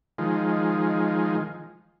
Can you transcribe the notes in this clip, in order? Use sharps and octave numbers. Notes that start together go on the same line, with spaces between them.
D#3 F3 G#3